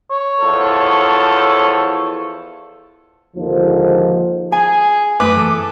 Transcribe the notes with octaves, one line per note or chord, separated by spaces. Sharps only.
C#5
E2 F3 A4
D#2 G#2 D3 D#3 F3
G#4 G#5
F#2 A3 B4 D6 D#6
E3 A4